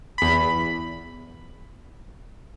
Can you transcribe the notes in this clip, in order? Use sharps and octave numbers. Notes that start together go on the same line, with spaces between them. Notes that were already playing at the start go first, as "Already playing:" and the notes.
E2 B5